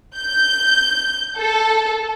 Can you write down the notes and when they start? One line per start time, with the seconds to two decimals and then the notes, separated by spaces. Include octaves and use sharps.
0.16 G6
1.37 A4